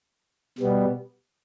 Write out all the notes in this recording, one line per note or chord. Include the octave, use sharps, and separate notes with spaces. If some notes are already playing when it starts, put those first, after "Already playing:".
B2 G3 B3